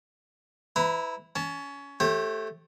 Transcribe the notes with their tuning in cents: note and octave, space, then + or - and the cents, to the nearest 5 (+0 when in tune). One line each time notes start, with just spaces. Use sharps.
E4 -10 B4 +30 A#5 +0
C#4 +20 A5 +0
A3 +0 G4 +0 C5 +45